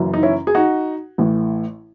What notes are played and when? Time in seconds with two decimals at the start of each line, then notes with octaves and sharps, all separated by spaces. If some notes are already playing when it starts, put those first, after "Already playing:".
Already playing: F#1 F#2 E3
0.14 D#4
0.23 C#4 E4
0.47 G#4
0.55 D#4 F#4
1.18 A1 A2 E3